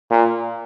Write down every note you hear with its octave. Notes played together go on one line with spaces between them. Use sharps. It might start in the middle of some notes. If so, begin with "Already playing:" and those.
A#2